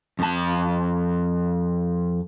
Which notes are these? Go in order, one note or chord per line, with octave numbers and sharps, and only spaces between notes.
F2 A5